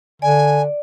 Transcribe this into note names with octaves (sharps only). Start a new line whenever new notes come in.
D3 D5 G#5